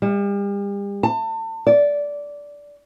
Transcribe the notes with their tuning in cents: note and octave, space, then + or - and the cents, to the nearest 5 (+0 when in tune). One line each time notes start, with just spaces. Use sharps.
G3 +40
A5 +35
D5 -15